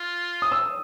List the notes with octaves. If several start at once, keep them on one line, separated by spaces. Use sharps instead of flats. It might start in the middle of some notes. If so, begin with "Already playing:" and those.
Already playing: F4
D#6
E6